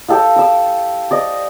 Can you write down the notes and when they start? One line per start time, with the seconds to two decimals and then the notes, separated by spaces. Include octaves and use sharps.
0.09 G4 A4 D#5 F5
0.36 D6 E6
1.11 D5 D#5